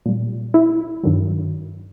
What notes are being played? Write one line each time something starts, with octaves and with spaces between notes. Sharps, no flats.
A#2 G3
E4
G2 D#3 F#3